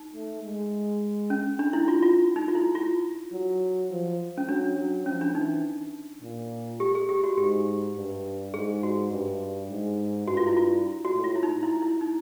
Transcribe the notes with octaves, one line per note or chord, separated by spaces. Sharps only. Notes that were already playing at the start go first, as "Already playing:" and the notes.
Already playing: D#4
A3
G#3
C#4
D4
E4
F4
F4
D#4
F4
E4
F4
F#3
F3
C#4
F#3 D4
F#3
F3 C#4
D4
E3 D#4
A#2
G4
G#4
G4
F#4
G#2 G4
G2
G#2 G#4
F#4
G2
G#2
G2 F#4
F4
E4
F4
F#4
A2
F4
E4
D#4
E4
E4
D#4